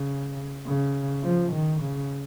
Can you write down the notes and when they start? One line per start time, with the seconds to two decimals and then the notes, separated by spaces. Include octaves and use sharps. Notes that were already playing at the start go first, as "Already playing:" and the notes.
Already playing: C#3
0.67 C#3
1.23 F3
1.52 D#3
1.82 C#3